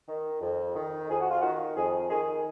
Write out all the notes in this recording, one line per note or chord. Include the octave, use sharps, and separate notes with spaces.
D#3
F2
D#3
F2 G#4
F#4
F4
D#3 F#4
F2 G#4
D#3 G#4